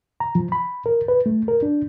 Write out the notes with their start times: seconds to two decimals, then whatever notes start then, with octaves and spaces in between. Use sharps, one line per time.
0.20 A#5
0.35 F3
0.52 B5
0.86 A#4
1.08 B4
1.26 A3
1.48 A#4
1.63 D4